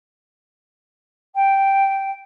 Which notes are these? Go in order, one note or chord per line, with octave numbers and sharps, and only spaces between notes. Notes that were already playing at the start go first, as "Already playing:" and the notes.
G5